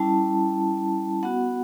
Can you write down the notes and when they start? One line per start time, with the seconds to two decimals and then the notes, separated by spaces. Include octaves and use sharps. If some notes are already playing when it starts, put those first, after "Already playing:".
Already playing: G3 C#4 E4 A5
1.23 B3 F#4 F#5